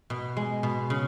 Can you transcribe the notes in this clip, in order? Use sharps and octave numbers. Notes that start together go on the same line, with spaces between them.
B2
G#3
B2
C#3